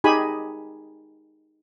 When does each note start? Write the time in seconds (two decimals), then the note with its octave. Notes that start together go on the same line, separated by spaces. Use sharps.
0.04 D#4 G4 G#4 G#5 B5